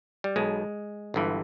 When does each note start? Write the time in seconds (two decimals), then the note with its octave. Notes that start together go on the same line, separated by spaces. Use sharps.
0.24 G3
0.36 B1 B2 G#3
1.14 G1 G2 E3